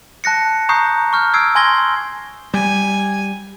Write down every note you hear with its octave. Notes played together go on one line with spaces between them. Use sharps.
A5 F#6 A#6 C#7
A#5 C#6 D#6 G6 C7
C#6 F6 G6
D#6 E6 G#6 C7 D7
G#5 C6 G#6 A#6 G7
G3 G#5